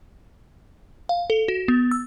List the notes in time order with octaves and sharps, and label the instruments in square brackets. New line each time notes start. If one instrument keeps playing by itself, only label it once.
[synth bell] F5
A4
F#4
B3
E6